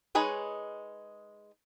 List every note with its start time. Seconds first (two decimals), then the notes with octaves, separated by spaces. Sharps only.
0.15 G#3 D#4 G#4 B4 C#5